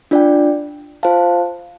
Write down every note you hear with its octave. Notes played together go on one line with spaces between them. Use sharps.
D4 F4 D5 G5
F4 C5 F5 A5